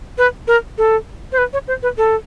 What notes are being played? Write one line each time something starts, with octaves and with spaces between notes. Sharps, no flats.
B4
A#4
A4
C5
B4
C#5
C5
B4
A4